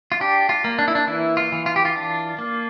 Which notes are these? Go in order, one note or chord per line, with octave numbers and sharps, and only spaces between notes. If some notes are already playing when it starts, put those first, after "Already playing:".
F4
D4 G4
F4
A#3
D4
E4
D4
E3 E4
F4
E3
F4
G4
F4
D4
A#3